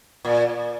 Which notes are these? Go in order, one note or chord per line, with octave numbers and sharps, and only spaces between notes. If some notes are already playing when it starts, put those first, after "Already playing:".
A#2